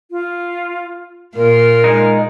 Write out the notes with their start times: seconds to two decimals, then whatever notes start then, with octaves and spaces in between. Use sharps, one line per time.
0.11 F4
1.36 A#2 F4 A#4
1.84 G#3 D#4